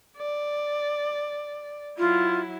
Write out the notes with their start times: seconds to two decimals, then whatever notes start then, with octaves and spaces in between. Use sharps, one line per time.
0.17 D5
1.98 F#3 E4 F4